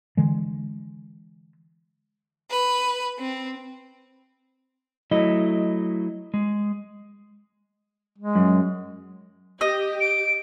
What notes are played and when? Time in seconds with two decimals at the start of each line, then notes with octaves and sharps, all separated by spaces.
0.17 D3 E3 G#3
2.50 B4
3.19 C4
5.11 F#3 A3 E4 D#5
6.34 G#3
8.18 G#3
8.35 F#2
9.61 G4 D#5
10.00 D7